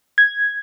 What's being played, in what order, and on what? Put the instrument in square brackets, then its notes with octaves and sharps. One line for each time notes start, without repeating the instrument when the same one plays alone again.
[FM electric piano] G#6